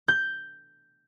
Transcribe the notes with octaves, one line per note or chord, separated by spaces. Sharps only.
G6